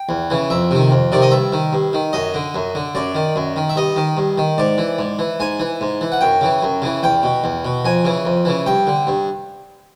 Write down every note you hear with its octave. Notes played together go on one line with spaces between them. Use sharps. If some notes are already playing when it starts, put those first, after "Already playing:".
Already playing: G5
E2
C#3 E3
F2 E5
C3 D#3
F2
C3 D#3 D5
D#5
G2 E5
D#3
G2
D#3
F#2 D#5
D3
F#2
D3
F#2 D5
D#3
F#2
D#3
E5
G2 D#5
D#3
G2
D#3
G#2 D5
E3
G#2
E3
G#2 G#5
E3
G#2
E3
F#5
F#2 G5
C#3 E3
F#2
C#3 E3
E2 G5
B2
E2
B2
F2 G#5
C#3 E3
F2
C#3 E3
G2 G5
D3
G2